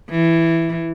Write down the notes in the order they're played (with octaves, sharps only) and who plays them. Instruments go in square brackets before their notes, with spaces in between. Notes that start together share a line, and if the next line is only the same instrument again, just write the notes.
[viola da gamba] E3